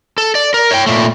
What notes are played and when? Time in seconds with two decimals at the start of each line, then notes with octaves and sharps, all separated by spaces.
0.18 A4
0.35 D5
0.54 A#4
0.71 C#5 G5
0.87 A#2 A3